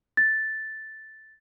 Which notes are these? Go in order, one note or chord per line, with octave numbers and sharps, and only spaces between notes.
A6